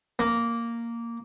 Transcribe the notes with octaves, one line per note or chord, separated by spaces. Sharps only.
A#3